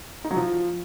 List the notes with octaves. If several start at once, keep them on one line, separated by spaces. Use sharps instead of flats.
D#4
F#3
F3